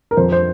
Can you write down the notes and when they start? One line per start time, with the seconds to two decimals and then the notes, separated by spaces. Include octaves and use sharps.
0.11 A#4
0.17 F2 C5
0.32 C5